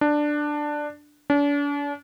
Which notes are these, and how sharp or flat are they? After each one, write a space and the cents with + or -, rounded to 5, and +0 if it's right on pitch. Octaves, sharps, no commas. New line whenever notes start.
D4 +10
D4 -40